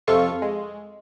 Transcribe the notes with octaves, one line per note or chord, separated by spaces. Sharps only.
F2 C3 F4 A4 C#6 C7
G#3